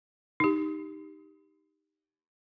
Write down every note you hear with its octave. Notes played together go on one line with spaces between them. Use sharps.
D#4 G4